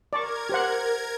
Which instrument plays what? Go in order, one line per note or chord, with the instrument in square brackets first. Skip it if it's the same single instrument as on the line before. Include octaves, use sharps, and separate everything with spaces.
[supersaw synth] A#4 G#6 [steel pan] D5 A5 C#6
[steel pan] G4 C5 F#5